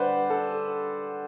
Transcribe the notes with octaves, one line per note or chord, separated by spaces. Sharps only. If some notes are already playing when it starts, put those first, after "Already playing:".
Already playing: D3 G3 B4 C5 D5 F#5
A4